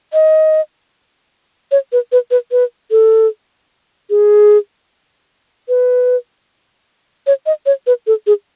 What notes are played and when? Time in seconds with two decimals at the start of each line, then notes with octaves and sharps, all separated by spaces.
0.13 D#5
1.72 C#5
1.92 B4
2.12 B4
2.31 B4
2.52 B4
2.91 A4
4.10 G#4
5.69 B4
7.27 C#5
7.46 D#5
7.66 C#5
7.87 B4
8.07 A4
8.27 G#4